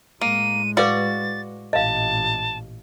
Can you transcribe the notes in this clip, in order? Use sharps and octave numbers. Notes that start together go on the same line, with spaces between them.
A2 G#3 A#3 D#7
F#4 B4 D5 F5 D6 A6
A1 A#2 D#5 F5 A5